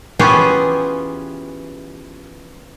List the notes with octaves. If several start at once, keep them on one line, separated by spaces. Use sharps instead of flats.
E3 B3 C#4 F4 G4 G#4